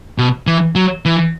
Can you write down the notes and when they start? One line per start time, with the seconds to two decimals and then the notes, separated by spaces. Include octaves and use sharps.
0.18 B2
0.47 E3
0.75 F#3
1.05 E3